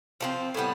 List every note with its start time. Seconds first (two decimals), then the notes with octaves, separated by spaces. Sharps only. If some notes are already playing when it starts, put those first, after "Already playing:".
0.20 F3 A3 C4
0.54 A2 G3 B3